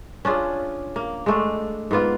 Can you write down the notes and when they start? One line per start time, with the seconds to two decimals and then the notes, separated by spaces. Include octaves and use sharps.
0.25 C#4 D4 F4 G#4
0.96 A#3
1.26 G#3 A3 D4
1.91 G#2 A#3 B3 F4